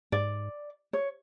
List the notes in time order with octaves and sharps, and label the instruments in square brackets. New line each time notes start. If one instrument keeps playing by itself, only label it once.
[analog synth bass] G#2 [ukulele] D5
[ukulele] C#5